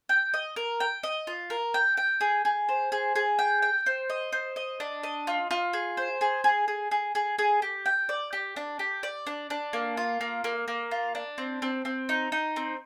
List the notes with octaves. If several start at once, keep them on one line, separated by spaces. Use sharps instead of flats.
G5
D#5
A#4
G5
D#5
F4
A#4
G5
G5
G#4
G#4
C5
G#4
G#4
G5
G5
C5
D#5
C5
D#5
D4
D#5
F4
F4
G#4
C5
G#4
G#4
G#4
G#4
G#4
G#4
G4
G5
D5
G4
D4
G4
D5
D4
D4
A#3
F4
A#3
A#3
A#3
F4
D4
C4
C4
C4
D#4
D#4
C4